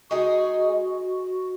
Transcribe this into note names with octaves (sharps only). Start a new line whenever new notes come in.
G#3 D#4 F#4 G#4